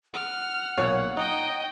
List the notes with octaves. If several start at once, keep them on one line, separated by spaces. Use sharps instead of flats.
F#5 F6
B1 A#2 C#5 F5
D#4 D#5 G5